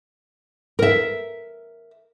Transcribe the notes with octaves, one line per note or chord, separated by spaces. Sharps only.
A#4 E5